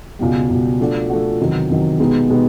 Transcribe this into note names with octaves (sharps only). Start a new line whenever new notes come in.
C#2 B2 G3
C#2 B2 G3
F3 A3 D4 F#4
F3 A3 D4 F#4
E2 C3 D#3 F#3
E2 C3 D#3 F#3
B2 G#3 B3 D#4 G4
B2 G#3 B3 D#4 G4